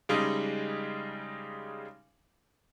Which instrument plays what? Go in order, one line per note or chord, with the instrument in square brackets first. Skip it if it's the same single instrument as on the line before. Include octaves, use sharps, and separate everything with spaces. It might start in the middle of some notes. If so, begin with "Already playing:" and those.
[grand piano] C#3 G3 G#3 D#4